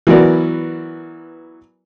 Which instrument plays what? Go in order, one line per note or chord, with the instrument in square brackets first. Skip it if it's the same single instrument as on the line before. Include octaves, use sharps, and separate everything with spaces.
[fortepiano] E3 F#3 B3 F#4 A#4 D5